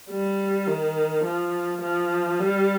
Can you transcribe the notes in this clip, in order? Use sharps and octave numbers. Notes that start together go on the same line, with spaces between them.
G3
D#3
F3
F3
G3